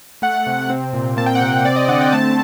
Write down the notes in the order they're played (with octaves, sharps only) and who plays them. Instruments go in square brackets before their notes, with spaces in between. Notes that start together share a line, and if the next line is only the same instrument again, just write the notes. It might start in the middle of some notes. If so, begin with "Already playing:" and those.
[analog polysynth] A3 F#5
C3
C4
A#2
A#3 A5
G5
F#5
C3 G5
C4 D5
D#5
D3 F#5
G5
A3 A5